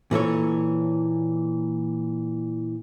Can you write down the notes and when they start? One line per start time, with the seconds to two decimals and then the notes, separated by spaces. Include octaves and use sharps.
0.11 A#2 E3 A4 C#5